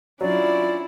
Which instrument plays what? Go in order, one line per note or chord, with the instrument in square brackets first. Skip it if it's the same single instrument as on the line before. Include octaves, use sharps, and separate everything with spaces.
[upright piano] F#3 [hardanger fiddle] C#4 E4 [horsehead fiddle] D4 F4 [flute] D5